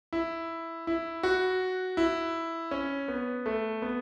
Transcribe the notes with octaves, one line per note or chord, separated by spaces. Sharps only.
E4
E4
F#4
E4
C#4
B3
A3
B3